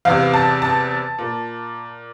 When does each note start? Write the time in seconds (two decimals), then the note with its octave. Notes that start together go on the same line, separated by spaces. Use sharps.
0.05 E2 C3 E3 F5
0.34 A5
0.62 A5
1.18 A#2